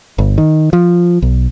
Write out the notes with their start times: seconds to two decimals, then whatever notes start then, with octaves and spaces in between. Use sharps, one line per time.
0.18 G1
0.38 D#3
0.73 F3
1.22 B1